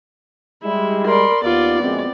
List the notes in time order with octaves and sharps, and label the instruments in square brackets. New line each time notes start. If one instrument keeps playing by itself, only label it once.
[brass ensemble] G3 G#3 [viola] E4
[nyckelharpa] A#4 D5 [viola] B5 C6
[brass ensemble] D#2 [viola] B3 D5 [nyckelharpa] F4
[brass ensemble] A#1 F#2 G#3 [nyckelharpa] C4